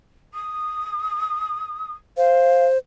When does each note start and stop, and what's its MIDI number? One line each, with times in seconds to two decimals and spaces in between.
0.34 1.92 87
2.17 2.78 72
2.17 2.64 77